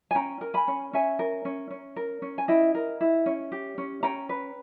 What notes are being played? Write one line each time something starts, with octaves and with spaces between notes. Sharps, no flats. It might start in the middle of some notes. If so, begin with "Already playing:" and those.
G#5
C#4 G5 A#5
A#4
G#5 B5
C#4
C#4 E5 G#5
A#4
C#4
C#4
A#4
C#4
G#5
E4 D#5 G5
A#4
E4
C#4
G4
C#4
C#4 G5 A#5
B4